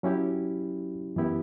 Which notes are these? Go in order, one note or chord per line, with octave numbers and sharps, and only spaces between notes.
F#3 C#4 E4 G4
F#2 E3 B3 E4 G4